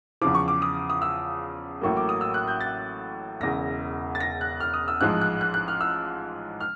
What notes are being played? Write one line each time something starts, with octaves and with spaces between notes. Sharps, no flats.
E2 C#3 F3 D6
C#6
D6
D#6
D#6
E6
A1 A2 F#3 A#3 C#6
D6
D#6
E6
F#6
G6
A6
E1 E2 C#3 A#6
A6
A#6
F#6
F6
D#6
E6
A1 G#2 F3 G#3 F#6
F#6
F#6
F#6
F6
E6
F6